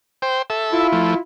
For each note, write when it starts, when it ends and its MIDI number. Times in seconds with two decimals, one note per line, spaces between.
0.22 0.42 72
0.22 0.42 79
0.50 0.87 69
0.50 0.87 76
0.72 1.19 64
0.72 1.19 65
0.92 1.14 53
0.92 1.14 57